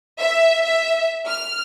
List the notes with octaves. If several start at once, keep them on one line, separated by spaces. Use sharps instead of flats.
E5
E5
F6